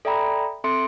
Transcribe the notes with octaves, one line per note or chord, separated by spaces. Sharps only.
A4 D5 E5 G5 A#5 B5
C4 A4 E5 C6 C#7 D7